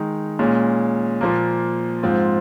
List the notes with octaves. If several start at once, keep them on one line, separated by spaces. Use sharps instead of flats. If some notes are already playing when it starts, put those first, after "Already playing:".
Already playing: D#3 G#3 D#4
A#2 G#3 C#4
A#2 F3 A#3
G#2 F3 C4 F4